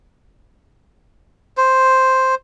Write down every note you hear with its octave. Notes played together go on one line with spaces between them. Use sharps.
C5